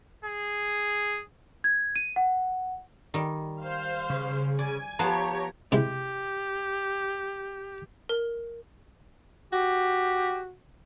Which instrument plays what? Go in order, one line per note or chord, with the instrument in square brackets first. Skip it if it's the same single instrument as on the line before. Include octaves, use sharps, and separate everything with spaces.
[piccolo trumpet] G#4
[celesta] G#6
D#7
F#5
[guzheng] D#3 G3
[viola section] C5 F5
[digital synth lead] C#3
[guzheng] D5 [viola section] G#5
[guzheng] F3 B3 A5 [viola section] G4 C#5 [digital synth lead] A#5
[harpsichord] C3 G#3 E4 [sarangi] G4
[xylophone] A#4
[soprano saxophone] F#4 [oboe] G4